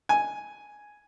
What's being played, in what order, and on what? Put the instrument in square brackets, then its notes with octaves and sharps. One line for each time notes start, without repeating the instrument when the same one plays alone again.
[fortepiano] G#5